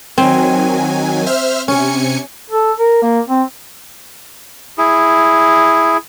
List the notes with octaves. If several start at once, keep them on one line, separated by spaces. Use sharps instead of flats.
D#3 F#3 C4 G#5
C5 E5 F6
C3 C#4 G#5 C#7
A4
A#4
A#3
C4
E4 G#4